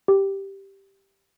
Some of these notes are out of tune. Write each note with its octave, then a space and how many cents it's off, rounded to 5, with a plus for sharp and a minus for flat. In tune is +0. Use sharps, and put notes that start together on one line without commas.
G4 +0